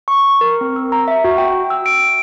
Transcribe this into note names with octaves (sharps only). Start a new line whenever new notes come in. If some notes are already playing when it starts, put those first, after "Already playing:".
C#6
A#4
C4
E6
A#5
E5
F#4
G5
E6
D7